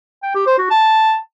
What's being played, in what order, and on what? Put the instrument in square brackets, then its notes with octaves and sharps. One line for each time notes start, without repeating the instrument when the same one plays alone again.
[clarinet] G5
G4
C5
F#4
A5